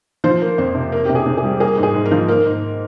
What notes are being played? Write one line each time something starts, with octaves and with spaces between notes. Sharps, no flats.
F3 C5
A#3
F2 C5
C3
A#3 A#4
C3 G4
G#4
C3
G#4
G3
A#3 G#4
G#2
G#4
G#2
A#4
F3
A#3 A#4
G#2